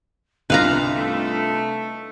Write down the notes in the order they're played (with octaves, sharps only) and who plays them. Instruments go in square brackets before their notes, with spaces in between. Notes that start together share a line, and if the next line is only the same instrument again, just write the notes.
[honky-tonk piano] C2 D#4 F4 [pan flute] D4 [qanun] B4 F5 A#5
[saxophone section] A3